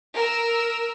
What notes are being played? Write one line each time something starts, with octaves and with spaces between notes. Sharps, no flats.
A#4 E6